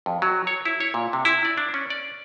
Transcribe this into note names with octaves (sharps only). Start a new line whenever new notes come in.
F2
F#3
C#5
E4
C#5
A#2
C3
E4
D5
D4
C#4
D5